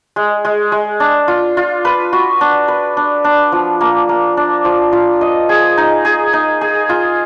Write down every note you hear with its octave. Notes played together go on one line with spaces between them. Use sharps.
G#3
G#3
G#3
D4
F4
F4
B4
F#4
D4
B4
D4
D4
F3
A#3
A#3
D4
F3
F4
D#5
G#4
D#4
G#4
D#4
G#4
F4